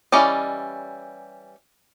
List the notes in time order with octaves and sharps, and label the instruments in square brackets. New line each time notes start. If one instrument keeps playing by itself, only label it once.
[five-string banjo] E3 G3 C#4 D5 D#5